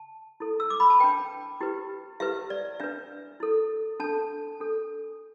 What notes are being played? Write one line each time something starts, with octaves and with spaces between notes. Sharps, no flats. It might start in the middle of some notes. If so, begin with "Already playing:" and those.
Already playing: A5
E4 A4
E6
D6
B5
A5
D4 B4 G5
E4 G4 B4
E4 G4 B4 E5
D5
D4 B4 E5
E4 A4
D4 A4 A5
D4 A4